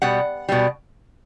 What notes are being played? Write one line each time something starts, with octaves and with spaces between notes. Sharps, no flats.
B2 G3 F#5
B2 G3